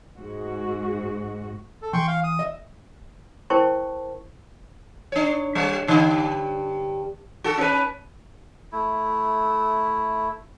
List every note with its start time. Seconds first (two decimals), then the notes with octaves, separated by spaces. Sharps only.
0.17 G#2 G#3 F#4
1.82 A4
1.93 E3 G5 C6 C#6
2.07 F5
2.24 D#6
2.39 D#5 E5
3.50 E4 A#4 C5 G5 A5 C#6
5.12 D4 C#5
5.55 G3
5.87 G2 D3
7.44 F#4 A4
7.57 C#4 B4
8.72 A3 E4